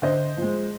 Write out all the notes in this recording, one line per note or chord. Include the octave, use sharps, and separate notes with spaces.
D3 C5 D#5
F3
G#3